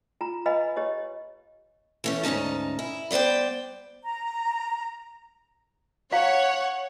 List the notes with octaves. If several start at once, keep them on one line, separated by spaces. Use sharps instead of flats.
F4 A#5
B4 D#5 F5 G#5 B5
G4 C#5 D#5
E3 A3 C#4
D2 G#2 C#4 D#4 A5
E4
G3 B3 C5 D5 G5
A#5
C#5 F5 F#5 A#5